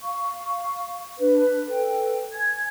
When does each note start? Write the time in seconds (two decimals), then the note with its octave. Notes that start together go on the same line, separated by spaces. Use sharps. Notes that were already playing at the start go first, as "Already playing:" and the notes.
0.01 F5 C#6
1.19 D4 B4
1.67 A4 B4 G5
2.34 G#5 G#6